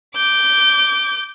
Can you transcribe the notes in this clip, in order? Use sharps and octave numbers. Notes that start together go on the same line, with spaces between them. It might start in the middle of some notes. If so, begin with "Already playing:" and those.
D6 G6